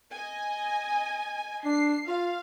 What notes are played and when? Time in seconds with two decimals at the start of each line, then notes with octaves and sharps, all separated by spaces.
0.12 D#5 G#5
1.65 D4 C7
2.08 F4 F5